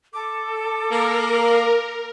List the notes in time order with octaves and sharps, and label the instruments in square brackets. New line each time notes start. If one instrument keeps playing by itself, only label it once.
[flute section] A4 [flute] D6
[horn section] A#3 [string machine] A#4